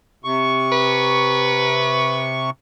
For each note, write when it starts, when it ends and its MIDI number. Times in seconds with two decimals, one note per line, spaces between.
0.24 2.50 48
0.24 2.50 85
0.72 2.30 71